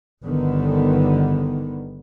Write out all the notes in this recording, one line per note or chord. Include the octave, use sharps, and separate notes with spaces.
G1 D3 D#3 B3